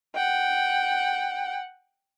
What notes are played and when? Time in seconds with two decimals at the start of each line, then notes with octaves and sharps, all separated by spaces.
0.15 F#5 G5